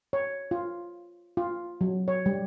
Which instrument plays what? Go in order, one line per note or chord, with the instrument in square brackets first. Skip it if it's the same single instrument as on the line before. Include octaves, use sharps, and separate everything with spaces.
[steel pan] C#5
F4
F4
F#3
C#5
G3